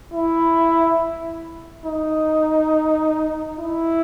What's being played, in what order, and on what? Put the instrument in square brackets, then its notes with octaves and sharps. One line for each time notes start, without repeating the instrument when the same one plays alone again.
[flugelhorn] E4
D#4
E4